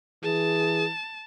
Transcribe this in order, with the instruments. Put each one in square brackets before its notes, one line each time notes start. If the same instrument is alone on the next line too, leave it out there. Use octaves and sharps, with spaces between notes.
[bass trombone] E3 [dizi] G#4 [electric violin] A5